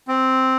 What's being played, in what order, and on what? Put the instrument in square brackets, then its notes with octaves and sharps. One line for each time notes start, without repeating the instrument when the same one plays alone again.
[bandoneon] C4